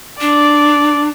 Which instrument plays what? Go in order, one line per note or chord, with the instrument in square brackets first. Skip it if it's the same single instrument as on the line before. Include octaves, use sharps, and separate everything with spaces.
[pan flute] D4 [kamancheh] D5